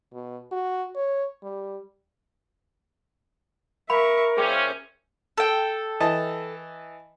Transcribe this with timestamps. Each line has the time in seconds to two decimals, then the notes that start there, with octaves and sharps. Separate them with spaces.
0.13 B2
0.52 F#4
0.95 C#5
1.43 G3
3.90 A#4 E5 F5 B5 C#6
4.37 A#2 C#4 G#4 C5 E5 G5 D6
5.38 A4 G5
6.00 E3 D#5 A5